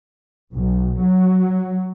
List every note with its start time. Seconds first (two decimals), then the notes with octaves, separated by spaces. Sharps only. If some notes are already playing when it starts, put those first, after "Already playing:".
0.54 B1
1.00 F#3